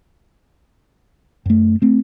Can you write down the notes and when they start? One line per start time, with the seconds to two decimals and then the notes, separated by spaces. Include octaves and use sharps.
1.46 F#2 A3
1.82 A3 C4